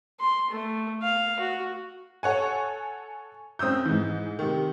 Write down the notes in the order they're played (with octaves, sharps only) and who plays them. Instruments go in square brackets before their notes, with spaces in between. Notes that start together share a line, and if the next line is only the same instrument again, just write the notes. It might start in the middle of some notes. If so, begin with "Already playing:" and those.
[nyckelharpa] C6
A3
F5
F#4
[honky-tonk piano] A4 C#5 F#5 G#5
F#2 C4 D#6 E6 G6
G#2 E3
C3 D#3